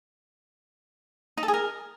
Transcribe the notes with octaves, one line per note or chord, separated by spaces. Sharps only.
D#4
A4
G#4
A#4